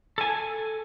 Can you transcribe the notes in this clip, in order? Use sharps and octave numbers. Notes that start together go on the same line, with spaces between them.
A4 G#5